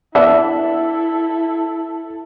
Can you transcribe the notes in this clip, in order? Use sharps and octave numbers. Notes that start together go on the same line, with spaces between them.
B3 D4 E4 A4 E5